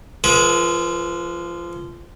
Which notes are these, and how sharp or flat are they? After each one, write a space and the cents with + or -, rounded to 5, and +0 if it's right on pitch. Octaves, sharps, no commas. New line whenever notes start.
F3 -20 G#4 +35 B4 -45